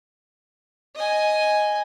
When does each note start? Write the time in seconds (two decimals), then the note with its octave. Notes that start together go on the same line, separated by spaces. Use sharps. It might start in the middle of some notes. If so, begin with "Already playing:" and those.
0.95 D#5 G#5